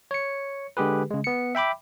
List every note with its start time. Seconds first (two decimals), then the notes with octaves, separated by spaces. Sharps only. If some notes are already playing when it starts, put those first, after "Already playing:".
0.11 C#5 C#7
0.77 D3 G#3 G4 G#4 B4
1.11 C#3 G#3
1.24 B3 C#7
1.55 E5 G5 B5 D6